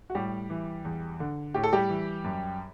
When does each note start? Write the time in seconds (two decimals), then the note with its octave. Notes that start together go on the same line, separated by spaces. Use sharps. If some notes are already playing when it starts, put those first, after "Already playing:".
0.10 F#4
0.15 A2 G3 G4
0.50 E3
0.85 E2
1.20 D3
1.54 A2 G4
1.63 A4
1.73 G3 G4
1.89 E3
2.24 F#2